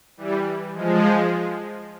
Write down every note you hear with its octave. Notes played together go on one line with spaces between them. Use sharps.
E3 G3
F3 G#3